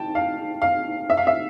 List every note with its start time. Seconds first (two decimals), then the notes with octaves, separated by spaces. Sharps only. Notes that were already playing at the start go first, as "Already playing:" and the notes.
Already playing: G5 A5
0.15 F5
0.62 F5
1.10 E5
1.17 F5
1.27 E5